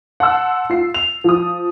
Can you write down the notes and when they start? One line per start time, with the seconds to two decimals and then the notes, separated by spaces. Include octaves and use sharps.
0.20 F#5 A5 C6 E6
0.70 F4 C7
0.94 F7
1.24 F3 D#6